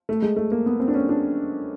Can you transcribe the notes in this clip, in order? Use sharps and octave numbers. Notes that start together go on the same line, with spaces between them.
A3
G#3
A3
A#3
B3
C4
D4
C#4
D4